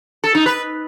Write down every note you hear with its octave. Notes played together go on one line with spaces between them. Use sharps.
A4
D#4
B4